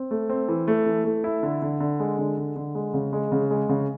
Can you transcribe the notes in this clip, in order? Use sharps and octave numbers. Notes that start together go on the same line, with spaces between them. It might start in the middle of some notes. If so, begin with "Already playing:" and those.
Already playing: C4
A3
C4
E3
A3
E3
A3
E4
D3
D3
D3
G#3
D3
D3
D3
G#3
C#3
G#3
C#3
G#3
C#3